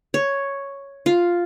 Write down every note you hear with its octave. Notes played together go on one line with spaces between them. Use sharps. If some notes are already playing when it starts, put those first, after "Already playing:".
C#5
F4